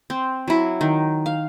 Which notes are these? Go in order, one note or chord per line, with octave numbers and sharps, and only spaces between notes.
C4
F#3 E4
D#3
F5